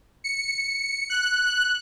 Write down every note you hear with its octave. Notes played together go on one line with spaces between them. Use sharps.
C#7
F#6